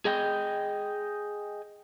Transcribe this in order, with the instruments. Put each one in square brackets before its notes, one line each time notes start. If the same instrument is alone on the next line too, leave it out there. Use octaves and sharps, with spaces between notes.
[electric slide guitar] G#4 D#5 G5